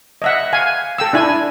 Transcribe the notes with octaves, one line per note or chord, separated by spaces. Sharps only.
D#5 E5 F#5
F5 G#5
A4 G5 E6
D4 E4 G#5